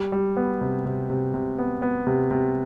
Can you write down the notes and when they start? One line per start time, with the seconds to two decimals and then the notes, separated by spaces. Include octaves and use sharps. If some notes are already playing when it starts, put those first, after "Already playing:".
Already playing: G3
0.12 G3
0.37 B3
0.61 C3
0.86 C3
1.10 C3
1.34 C3
1.58 B3
1.82 B3
2.07 C3
2.31 C3